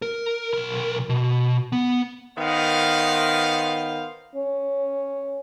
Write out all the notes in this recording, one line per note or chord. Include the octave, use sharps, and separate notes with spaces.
A#4
B1 A#4
B2
B3
D#3 B3 C5 F5
C#4